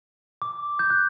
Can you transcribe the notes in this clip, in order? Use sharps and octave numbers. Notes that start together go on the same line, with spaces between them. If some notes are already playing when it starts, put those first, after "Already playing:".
D6
G6
F#6